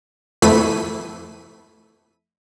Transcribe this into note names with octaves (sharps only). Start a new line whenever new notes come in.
F2 A3 E4 B6 D#7